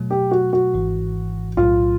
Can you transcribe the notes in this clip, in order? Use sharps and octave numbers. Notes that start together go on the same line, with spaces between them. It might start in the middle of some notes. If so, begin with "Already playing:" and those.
Already playing: B2 F#3 A3
G4
F#4
F#4
G#1 G#2 E3
B1 A2 F#3 F4